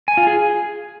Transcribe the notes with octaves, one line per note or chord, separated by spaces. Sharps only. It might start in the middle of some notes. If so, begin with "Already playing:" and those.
G#5
F4
G#4